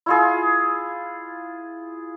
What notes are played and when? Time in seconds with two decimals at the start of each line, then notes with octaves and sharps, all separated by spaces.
0.06 E4 F4 G#4